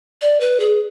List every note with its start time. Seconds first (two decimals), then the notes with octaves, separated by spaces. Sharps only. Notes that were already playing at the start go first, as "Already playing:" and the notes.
0.22 D5
0.40 B4
0.60 G#4